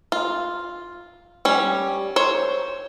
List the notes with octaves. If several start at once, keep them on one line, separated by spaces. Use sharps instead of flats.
F4
G3 C#4
C5 C#5